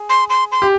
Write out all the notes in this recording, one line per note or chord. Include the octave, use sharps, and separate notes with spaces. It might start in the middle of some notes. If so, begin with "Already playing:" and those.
Already playing: G#4
C6
C6
C6
G4